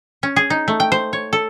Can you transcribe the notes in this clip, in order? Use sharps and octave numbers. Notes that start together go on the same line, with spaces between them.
C#4
G#4
D#4
A3
G5
C5
C#5
A4